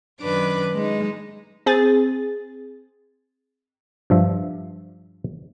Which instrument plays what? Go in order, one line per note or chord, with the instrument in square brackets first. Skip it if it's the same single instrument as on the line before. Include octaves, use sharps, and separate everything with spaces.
[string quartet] F#2 D#3 D4 B4 D6
G#3 D#4
[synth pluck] C4 G#4 A6
[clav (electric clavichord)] G2 F3 E5